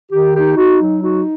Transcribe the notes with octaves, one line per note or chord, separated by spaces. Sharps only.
D#3 G4
D#4 G4
D#4 F#4
F#3
D#4 F#4